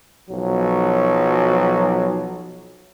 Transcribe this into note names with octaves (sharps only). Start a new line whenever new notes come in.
B1 F3 F#3